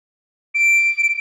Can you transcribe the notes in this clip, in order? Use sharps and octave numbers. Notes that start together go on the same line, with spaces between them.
D7